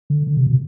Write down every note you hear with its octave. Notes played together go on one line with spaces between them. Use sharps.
D3
D3
C3
B2